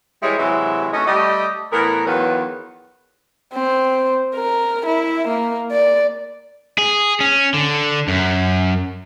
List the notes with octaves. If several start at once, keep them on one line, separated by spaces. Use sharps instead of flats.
E3 G3 G#3 E4 G#4 C#5
C3 E3 F#3 G#3 E4
A3 C#4 F#4 C#5 D#5
G3 A3 G4 D#5
A2 E3 B3 A#4
E2 D#3 F#3 F4 F#4 B4
C4
A#4
E4
A#3
D5
G#4
C#4
D3
F#2